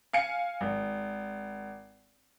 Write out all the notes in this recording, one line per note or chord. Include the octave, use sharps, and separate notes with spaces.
F5 G#5 C#7
G#1